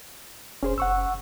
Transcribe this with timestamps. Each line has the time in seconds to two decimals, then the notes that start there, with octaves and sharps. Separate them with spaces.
0.63 F1 C#4 G#4 C5
0.78 F#1 F#5 C#6 E6